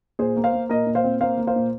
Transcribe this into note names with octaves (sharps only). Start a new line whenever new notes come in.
A#2 G#4 C5
A#3
C5 F5
A#3
A#2 A#4 D#5
A#2
C5 F5
C4
A#3 C5 F5
A#3
C5 F5
A#2